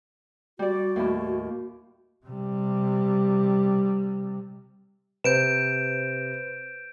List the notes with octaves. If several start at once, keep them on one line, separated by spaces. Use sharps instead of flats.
G3 F#4 D5
D#2 A2 E4
C3 G3
C3 B4 C5 G6 D7 E7